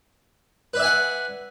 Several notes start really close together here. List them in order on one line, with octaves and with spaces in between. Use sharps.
B4 D5 E5 G#5 F#5